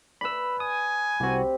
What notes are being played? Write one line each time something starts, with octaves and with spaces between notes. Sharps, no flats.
B4 D5 B5 E6
G#5 D#6
C2 C4 F#4 G4